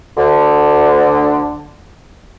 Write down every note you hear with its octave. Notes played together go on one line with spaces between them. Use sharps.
D2 D3